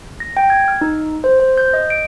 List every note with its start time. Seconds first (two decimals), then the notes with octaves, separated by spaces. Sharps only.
0.20 A#6
0.37 G5
0.50 G#6
0.68 F6
0.81 D#4
1.24 C5
1.40 C5
1.58 G6
1.74 D#5
1.90 D7